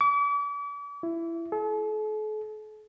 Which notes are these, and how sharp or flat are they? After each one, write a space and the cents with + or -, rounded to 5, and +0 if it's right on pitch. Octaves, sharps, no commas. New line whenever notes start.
D6 -40
E4 +20
A4 -45